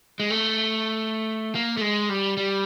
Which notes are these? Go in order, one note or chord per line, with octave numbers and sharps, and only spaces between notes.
G#3
A3
A#3
A3
G#3
G3
G3